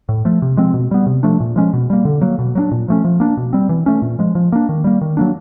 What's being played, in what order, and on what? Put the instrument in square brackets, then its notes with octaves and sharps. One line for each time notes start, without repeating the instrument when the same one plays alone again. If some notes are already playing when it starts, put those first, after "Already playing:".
[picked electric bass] A2
F3 A3
C3
F3 G#3 C4
B2
G3 B3
C3
F3 A3 D4
A#2
F3 G#3 C#4
B2
G3 A#3
D3
F#3 A#3
B2
F#3 A#3 D4
A#2
F3 A3 C#4
F3
A#3 D4
B2
G3 C4
E3
A3 C#4
A#2
F3 G#3
F3
A#3 D4
D#3
G3 A#3
D#3
F#3 A#3 D4